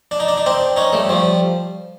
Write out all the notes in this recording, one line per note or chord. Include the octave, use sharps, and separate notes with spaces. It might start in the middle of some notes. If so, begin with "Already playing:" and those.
D4
D#4
D4
D#4
C4 D4
C#4 D#4
G3 A3
F3 G3